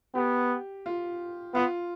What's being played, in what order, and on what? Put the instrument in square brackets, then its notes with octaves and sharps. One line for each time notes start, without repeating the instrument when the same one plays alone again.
[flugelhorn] B3 [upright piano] G4
[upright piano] F4
[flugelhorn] B3 [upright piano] F4